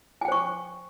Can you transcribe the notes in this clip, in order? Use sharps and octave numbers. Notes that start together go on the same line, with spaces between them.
C5 G5 G#5 C#6